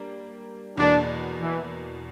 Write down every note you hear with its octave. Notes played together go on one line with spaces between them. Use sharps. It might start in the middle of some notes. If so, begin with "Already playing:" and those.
Already playing: G3 A#3 D4
E2 B2 A#3 D4
E3